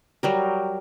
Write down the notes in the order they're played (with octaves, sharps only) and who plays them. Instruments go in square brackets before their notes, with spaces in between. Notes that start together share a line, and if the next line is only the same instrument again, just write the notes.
[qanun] F#3 G3 A#4